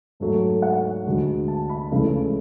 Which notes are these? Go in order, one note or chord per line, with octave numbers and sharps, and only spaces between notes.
G#2 F#3 A3 A4
A4
F#5
D2 D3 G#3
A5
B5
C#2 C#3 E3 A3